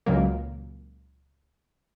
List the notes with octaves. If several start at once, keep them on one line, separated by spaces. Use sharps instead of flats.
C#2 A#2 F#3 A#3